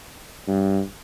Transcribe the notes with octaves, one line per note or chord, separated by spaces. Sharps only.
G2